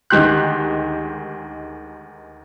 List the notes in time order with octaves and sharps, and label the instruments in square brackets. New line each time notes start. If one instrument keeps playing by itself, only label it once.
[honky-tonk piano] D2 D#3 G#3 G4 C6 F#6